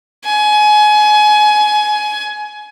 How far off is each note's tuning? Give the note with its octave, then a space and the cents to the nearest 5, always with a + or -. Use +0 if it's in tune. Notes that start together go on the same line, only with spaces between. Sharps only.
G#5 +25